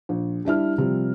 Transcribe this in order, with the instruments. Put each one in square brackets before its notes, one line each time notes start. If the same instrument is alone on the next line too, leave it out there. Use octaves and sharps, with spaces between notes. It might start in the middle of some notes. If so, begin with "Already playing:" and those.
[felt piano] A#1
G3 D4 E4 F6
C3 F3 G3